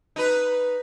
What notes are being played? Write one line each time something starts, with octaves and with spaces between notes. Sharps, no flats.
D#4 B4